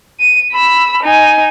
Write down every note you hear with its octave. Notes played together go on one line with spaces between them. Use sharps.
D#7
B5 E6
D#4 G#5